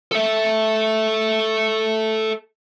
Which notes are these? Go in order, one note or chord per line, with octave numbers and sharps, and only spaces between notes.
A4 E5